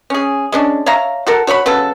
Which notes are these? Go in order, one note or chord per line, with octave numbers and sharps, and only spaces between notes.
C#4 G#4
G#3 C#4 D4
C#5 E5 F5 A#5
F#4 A4 A#4
F#4 C#5 E5 B5
C#3 F#3 B3 A4